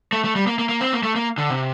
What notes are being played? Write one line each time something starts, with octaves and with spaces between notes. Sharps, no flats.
A3
A3
G3
A#3
A#3
A#3
C4
A#3
A3
A#3
D3
C3